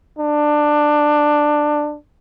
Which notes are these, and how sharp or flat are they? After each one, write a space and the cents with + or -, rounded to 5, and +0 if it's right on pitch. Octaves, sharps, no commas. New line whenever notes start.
D4 +15